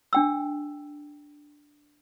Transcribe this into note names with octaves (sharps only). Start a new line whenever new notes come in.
D4 G5 E6